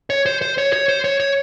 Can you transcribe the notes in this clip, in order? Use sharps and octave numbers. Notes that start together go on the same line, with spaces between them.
C#5
C5
C5
C#5
C#5
C5
C#5
C#5